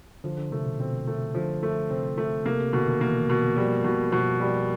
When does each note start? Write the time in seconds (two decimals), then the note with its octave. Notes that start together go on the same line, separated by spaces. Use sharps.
0.24 D3 F3
0.37 D3
0.51 C3 A3
0.66 B2
0.80 B2 C4
1.07 A3
1.35 D3 F3
1.63 A3
1.90 C3 C4
2.17 A3
2.46 C3 A#3
2.60 C3
2.73 B2 D3
2.87 D#3
3.01 E3 A#3
3.30 B2
3.56 F3 G3
3.84 B2
4.12 B2 F3
4.40 G3